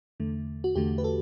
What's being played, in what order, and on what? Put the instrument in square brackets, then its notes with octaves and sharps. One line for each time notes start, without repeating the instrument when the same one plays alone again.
[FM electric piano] E2 D3 A3
F#4
E2 D3 A3 G4
B4
A4